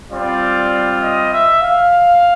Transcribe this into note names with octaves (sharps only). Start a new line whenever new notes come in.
G3 C4 F4 D5
D#5
E5
F5